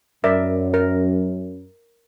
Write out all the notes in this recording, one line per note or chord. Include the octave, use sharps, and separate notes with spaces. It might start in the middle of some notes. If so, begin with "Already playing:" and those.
F#2 A#4 D5 E5
A#4